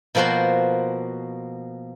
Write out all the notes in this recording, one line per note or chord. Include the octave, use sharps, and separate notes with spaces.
B2 F3 A#3 F#4 C5 C6